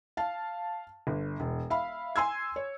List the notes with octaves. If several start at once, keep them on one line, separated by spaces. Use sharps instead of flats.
F5 A5
G1
E1
E5 F5 B5
G#5 C6 E6 G#6
C#5